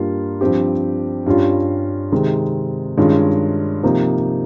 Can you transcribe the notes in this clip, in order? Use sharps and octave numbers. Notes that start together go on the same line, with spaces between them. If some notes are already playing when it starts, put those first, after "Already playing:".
Already playing: G2 G3 A#3 F4
G2 F3 C4 G4
G2 G3 C#4 F4
C3 D#3 G#3 C4
G2 D#3 G#3 C#4 F4
C3 F3 A#3 D#4